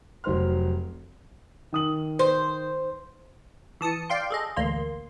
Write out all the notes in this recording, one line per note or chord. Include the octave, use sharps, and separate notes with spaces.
F1 F#3 C5 C6 F6
D#3 D#6 F#7
C5
E3 A5 D#6 C#7
D5 F5 G5 C6
G#4 A4 D#5
A1 D2 A#3 C6